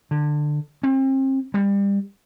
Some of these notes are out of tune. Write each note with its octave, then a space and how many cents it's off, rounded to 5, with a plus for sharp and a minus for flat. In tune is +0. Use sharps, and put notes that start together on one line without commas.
D3 +20
C4 +35
G3 +30